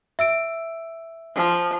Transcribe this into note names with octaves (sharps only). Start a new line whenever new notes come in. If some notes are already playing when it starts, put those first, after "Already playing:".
E5 E6 D7
F3